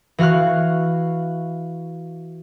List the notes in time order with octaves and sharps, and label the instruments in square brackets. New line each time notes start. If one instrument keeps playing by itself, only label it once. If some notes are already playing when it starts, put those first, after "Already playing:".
[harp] E3 F#4 F5 C#6 F#6